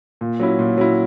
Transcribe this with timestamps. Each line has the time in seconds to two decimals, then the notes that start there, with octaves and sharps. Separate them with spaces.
0.21 A#2
0.39 F#3 C#4 E4
0.59 A#2
0.78 F#3 C#4 E4